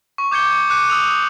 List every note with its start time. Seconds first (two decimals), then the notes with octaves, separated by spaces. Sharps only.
0.18 C#6
0.31 D6 G6 G#6 C#7 G7
0.70 D6 F#6 C#7 D#7
0.90 D#6 E6 F7